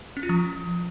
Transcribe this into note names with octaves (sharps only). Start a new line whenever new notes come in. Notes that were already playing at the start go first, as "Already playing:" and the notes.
C#4
F4
F3